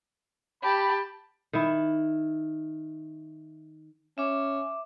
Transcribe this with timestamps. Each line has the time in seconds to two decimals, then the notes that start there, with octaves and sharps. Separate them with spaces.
0.63 G4 A5 B5
1.53 D#3 E4
4.18 C#4 E5 D6